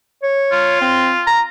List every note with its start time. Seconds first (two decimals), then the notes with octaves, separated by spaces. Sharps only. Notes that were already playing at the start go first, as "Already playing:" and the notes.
0.23 C#5
0.52 F4
0.81 C4
1.27 A#5